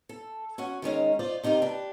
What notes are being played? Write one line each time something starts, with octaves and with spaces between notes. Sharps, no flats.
A4
C#4 F#4 F#5
D#3 G#3 C#4 D#4
F4 C5 D5 D#5
C3 D#4 F4 G4 A#4
D4 G4 B4